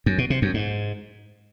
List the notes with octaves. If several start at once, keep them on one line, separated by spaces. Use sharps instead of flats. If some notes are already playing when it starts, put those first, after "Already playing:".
F#2
B2
C3
F#2
G#2